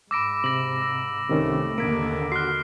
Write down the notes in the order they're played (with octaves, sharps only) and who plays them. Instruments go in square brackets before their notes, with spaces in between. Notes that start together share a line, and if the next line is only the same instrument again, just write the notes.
[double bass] G#2 [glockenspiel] B5 E6 [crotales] D6 A#6 D7
[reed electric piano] C3 [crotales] A#6 F#7
[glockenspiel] E6
[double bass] C2 A3 [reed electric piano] C3 D#3 C#4
[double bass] D#2 D3 [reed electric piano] A#3 [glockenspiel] G#6 B6 D7
[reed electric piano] F#4 [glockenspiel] C6 F#6 [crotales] F6 C7